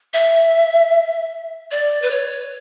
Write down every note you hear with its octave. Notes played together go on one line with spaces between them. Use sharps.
E5
D5
B4
C#5